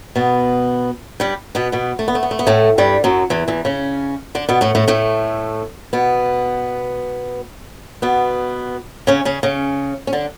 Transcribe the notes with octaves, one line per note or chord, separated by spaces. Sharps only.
B2 B3
G2 G3
B2 B3
B2 B3
A3
B3
A3
B3
A3
B3
A2 A3
G2 G3
F#2 F#3
E2 E3
E2 E3
C#3 C#4
D3 D4
B2 B3
A2 A3
A2 A3
A2 A3
B2 B3
B2 B3
C#3 C#4
C#3 C#4
C#3 C#4
C#4
D3 D4